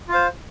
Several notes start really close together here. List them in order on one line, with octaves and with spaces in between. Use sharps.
F4 F5 C5